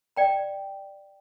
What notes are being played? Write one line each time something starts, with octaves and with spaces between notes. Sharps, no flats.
D5 G5 A#5